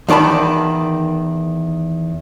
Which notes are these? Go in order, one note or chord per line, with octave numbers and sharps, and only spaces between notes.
E2 D#3 D5 A5 B5